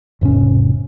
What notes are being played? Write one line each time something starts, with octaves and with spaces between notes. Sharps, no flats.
E1 G#2 C3 C#4